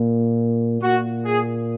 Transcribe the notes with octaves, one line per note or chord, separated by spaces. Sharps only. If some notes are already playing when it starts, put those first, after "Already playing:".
Already playing: A#2
A#2 F#4
G#4